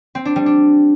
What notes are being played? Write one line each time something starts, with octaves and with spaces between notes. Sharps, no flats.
C4
D4
G3
D4